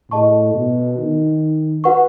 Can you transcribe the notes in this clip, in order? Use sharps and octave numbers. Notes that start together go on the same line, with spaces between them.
A2 G#4 D#5 A5 C#6
B2
D#3
F#4 B4 F#5 C#6